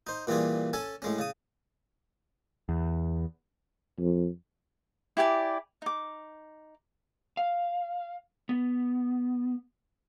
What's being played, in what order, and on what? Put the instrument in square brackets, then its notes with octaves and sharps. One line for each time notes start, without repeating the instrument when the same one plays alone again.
[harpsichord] D#4 C5
A#2 E3 G3 F4 G#4
C#4 A4 G#5 A5
A2 G#3 C#4
C#3 D#6
[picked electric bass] E2
[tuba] F2
[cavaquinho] E4 G4 D5 G#5
D#4 D6
[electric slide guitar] F5
B3